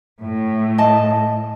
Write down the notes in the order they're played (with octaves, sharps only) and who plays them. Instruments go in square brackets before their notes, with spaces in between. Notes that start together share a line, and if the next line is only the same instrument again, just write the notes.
[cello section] A2
[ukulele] D#5 A5